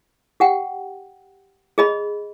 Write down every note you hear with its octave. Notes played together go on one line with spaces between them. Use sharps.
G4 F#5 G5
G#4 D#5 B5